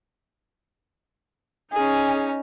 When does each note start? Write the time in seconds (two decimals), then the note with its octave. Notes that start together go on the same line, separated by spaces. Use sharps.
1.73 C#4 D#4 G#4